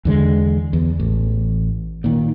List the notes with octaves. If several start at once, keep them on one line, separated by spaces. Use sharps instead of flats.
E2 D3 G#3
E2
A1
A#2 D#3